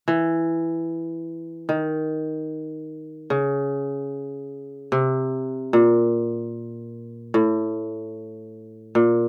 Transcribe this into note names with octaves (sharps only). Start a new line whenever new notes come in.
E3
D#3
C#3
C3
A#2
A2
A#2